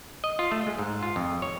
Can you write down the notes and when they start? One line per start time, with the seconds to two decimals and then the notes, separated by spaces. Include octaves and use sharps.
0.24 D#5
0.39 F4
0.52 A3
0.66 G#3
0.78 G#2
1.03 F4
1.16 F2
1.42 C#5